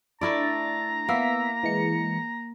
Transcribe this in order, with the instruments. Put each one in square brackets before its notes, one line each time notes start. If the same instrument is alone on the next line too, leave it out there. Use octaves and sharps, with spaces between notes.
[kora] A3 E4 D5 [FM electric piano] D4 A6 [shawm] A#5
[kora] A#3 [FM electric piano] B3 E5 B6
[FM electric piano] E3 G#3 C#7